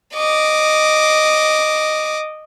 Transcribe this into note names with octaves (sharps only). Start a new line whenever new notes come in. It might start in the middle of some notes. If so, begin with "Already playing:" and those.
D#5 D6